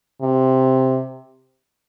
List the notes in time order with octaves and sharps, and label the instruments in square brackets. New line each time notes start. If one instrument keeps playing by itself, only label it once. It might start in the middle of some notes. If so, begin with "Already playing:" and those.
[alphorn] C3